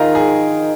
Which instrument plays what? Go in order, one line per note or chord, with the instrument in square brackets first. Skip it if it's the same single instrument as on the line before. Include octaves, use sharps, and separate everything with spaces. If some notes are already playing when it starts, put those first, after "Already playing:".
Already playing: [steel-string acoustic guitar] D#3 D#4 [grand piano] F4 G#4 A#4
[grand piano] G#4